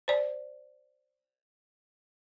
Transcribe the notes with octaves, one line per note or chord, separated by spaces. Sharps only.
C5 D5